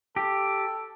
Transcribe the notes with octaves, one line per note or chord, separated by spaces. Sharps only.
G4 A4